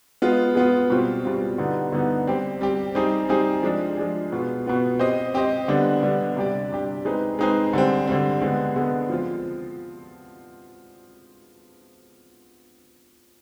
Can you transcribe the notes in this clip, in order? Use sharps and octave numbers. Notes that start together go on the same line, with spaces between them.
G#3 B3 F4
G#3 B3 F4
B2 G3 C4 F4
B2 G3 C4 F4
D3 G3 B3 D#4
D3 G3 B3 D#4
G3 C4 G4
G3 C4 G4
G3 C4 D#4 G#4
G3 C4 D#4 G#4
F3 G#3 D4 G#4
F3 G#3 D4 G#4
B2 B3 F4
B2 B3 F4
C4 G4 C5 D#5
C4 G4 C5 D#5
D3 G3 B3 D4
D3 G3 B3 D4
C3 G3 D4 G4 D5
C3 G3 D4 G4 D5
G#3 C4 D#4 G#4 B4
G#3 C4 D#4 G#4 B4
D3 G3 C4
D3 G3 C4
D3 G#3 B3
D3 G#3 B3
F3 C4 F4